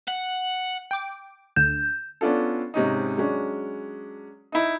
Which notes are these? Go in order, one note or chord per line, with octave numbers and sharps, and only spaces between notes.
F#5
G5 D6
D2 D3 G6
B3 C#4 D4 F4 A4
G#2 C3 C#4 D#4
F#3 G#3 C#4 D4
D#4 E4